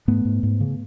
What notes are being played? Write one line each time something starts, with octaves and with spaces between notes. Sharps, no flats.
G#2 A3 B3
G#2
G#2
C#3